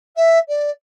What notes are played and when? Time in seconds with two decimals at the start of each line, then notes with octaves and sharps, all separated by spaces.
0.16 E5
0.48 D5